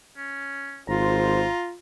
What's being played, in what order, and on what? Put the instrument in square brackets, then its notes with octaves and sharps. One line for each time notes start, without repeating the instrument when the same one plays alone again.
[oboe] C#4
[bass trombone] G#1 [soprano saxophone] F4 [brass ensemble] C5 [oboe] A#5